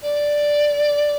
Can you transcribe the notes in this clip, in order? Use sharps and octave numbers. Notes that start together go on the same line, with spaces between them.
D5